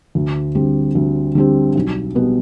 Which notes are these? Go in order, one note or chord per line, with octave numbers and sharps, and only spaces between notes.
D2
D3 G3 C4 G4
D2
D3 G3 C4 G4
B1
B2 G3 B3